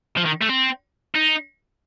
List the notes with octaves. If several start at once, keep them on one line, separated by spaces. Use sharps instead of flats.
F3
D#3
A3
C4
D#4